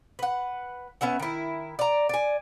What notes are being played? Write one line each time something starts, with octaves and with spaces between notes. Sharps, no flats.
B4 F#5
B3 C#4 E5 F#5
D#3 E4
D5 A#5
D5 G#5